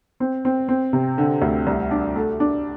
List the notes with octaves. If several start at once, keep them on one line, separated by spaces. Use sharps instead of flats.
C4
C4
C4
C3
D3
D2
C2
D4
A3
D4